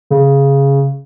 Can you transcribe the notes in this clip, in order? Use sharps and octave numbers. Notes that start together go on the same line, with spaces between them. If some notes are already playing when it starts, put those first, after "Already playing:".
C#3